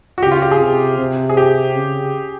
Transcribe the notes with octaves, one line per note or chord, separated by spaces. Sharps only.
F#4
C#3 G4
F4
G4
G#4
C3
C3
G#4
G4
C#3